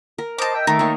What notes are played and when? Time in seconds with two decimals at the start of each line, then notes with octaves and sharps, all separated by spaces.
0.18 A#4
0.38 C5 D#5 A5 D6
0.55 D#5 E5 G5
0.67 D#3 A3 A#4
0.79 D#3 A#3 C#5